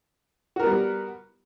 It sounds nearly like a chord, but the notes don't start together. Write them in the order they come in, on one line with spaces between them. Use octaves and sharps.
F#4 A#4 B3 G3